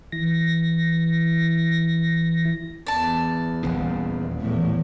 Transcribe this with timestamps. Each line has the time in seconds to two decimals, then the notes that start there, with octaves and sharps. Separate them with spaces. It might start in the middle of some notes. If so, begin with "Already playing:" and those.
0.12 E3 A#6
2.86 E2 D5 A5
3.63 D#1 G#1 C#3
4.41 E2 A2